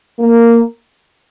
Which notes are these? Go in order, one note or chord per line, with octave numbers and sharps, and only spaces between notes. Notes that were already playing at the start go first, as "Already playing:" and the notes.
A#3